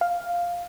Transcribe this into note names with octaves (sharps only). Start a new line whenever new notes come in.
F5